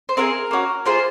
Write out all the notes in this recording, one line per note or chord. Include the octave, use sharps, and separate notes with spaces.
C5
C4 F4 G#4 A#4
A#3 C#4 F#4
A#3 F4 G#4 C5